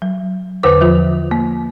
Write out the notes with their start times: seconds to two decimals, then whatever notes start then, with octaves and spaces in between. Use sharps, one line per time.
0.02 F#3
0.63 E2 D3 B4 C5 D6
0.81 F3 F4
1.31 A#3